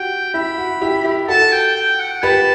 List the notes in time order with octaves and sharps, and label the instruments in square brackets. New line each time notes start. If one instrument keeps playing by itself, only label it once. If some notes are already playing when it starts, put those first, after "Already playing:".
Already playing: [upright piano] F#4 G4 [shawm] G5
[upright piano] E4 [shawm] B5
[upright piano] F#4
E4 G4
E4 G4
[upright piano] F#4 A4 [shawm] A5
[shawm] G5
G5
F#5
[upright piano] G4 B4 [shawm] A5